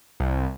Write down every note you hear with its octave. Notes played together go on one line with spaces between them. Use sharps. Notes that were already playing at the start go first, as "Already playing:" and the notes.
C2